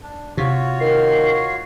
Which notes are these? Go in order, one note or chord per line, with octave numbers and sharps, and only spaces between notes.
D4
C3 F4 F#4 C#5
D#3 C7